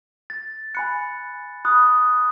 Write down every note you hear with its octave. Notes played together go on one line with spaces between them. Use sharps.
A6
G#5 B5 F#6 C#7
B5 D#6 F#6